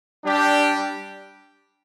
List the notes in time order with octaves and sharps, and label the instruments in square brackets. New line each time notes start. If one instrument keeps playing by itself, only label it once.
[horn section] G3 D4 G4